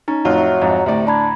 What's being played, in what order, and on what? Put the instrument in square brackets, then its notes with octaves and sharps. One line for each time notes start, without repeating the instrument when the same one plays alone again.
[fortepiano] C#4 [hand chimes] D#4 A#5
[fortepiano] F2 A2 F4 [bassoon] F#3
[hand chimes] E5
[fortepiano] F2 G#2 [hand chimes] A#5
[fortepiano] D2 A2 D5 [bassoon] C3
[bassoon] D4 [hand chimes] A#5 B5 G#6